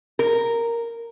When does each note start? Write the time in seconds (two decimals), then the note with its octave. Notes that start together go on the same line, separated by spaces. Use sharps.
0.19 A#4